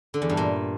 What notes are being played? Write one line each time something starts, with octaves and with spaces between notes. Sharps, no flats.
D3
E2
G2
A#2